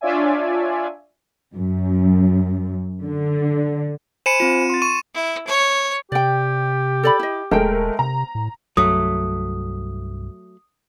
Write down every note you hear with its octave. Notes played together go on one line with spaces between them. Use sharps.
D4 F4 C#5 D5 E5 G#5
F#2
D3
C5 G#5 B5 C#7 D#7 E7
C4 F4 E7
C6 A6
C#6 D#7
E4
C#5
C3 G4 D5 G5
A4 D5 B5
E4 D#5
D#1 G#3 A3 A#4 C5 G5
C3 A#5
A2
C2 G2 F#3 A3 D#6